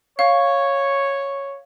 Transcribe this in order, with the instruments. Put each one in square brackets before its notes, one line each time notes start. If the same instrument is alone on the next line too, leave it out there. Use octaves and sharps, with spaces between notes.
[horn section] C#5 [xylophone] F5